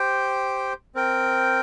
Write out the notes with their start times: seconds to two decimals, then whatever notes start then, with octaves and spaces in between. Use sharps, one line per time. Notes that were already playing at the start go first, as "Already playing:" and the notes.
Already playing: G4 C5 G5
0.95 C4 A#4 G5